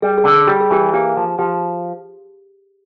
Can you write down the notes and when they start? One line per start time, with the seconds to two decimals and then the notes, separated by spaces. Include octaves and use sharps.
0.02 G3 G#4
0.18 G#4
0.25 D3
0.32 G#4
0.48 G3 G4
0.60 G#4
0.71 E3 G4
0.93 A#3 G4
1.17 F3
1.39 F3 G4